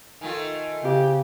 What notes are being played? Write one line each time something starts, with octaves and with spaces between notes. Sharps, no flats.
D#3 A3 F4 G#5
C#3 C4 G4